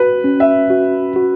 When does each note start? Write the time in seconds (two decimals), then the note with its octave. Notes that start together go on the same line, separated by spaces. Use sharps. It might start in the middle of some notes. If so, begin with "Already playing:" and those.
Already playing: F#4 B4
0.24 C#4
0.40 E5
0.70 F#4
1.16 F#4